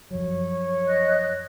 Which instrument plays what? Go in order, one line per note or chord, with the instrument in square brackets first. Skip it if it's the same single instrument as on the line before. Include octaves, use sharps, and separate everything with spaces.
[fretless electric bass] F#2 F3 F#3 [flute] C#5
[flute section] D#5 F#6